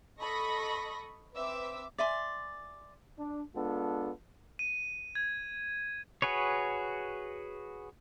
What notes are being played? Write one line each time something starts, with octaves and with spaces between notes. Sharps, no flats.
A4 D#5 B5 C#6 D#6 A#6
C4 B4 E5 D6 E6
D5 E5 G#5 C6
D4
G#3 B3 D4 F4 A4
D#7
G#6
F#4 G#4 B4 C#5